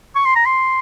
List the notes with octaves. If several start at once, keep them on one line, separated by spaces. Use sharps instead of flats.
C#6
C6
A#5
C6